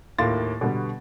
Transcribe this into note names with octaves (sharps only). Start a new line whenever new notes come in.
D#2 A2 A#3 F4 C6 A6
B2 D3 G3 B3